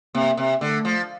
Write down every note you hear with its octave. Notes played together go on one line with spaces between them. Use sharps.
C3 A#3
C3
D3 A3
F3